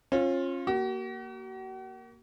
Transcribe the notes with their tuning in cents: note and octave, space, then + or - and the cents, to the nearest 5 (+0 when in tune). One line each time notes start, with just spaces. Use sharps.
C#4 -35 F4 +5
A#3 +0 F#4 +40